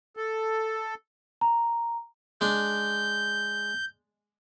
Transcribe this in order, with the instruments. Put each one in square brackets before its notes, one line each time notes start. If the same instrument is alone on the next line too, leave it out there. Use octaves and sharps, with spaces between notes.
[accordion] A4
[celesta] A#5
[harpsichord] G#3 D4 [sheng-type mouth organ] G6